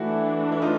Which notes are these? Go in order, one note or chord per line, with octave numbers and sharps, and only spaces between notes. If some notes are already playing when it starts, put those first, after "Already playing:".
Already playing: E3 A3 D4 E4 F#4
E4
D#4 F4